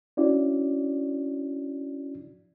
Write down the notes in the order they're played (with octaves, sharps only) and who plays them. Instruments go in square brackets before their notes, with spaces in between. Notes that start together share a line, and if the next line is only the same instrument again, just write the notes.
[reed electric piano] C#4 D4 E4 F#4 D5